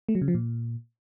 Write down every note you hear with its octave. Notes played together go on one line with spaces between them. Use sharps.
A3
F#3
C#3
F3
A#2